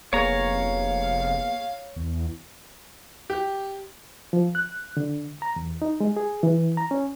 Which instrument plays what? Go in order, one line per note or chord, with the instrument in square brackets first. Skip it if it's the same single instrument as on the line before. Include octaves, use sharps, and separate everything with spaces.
[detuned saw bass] F1 [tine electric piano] A#3 B3 G#4 [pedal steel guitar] C#5 A#5 [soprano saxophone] F5
[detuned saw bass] E2
[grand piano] G4
[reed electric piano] F3
F#6
D3
A#5
E2
D#4
G#3
G#4
E3
A#5
C#4